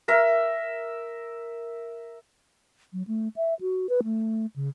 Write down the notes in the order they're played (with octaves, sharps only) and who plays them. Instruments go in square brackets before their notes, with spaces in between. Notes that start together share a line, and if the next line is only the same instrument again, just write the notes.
[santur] A#4 E5
[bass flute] F#3
A3
E5
F#4
B4
A3
C#3